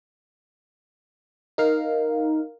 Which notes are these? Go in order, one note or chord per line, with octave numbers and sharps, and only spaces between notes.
D#4 A#4 F5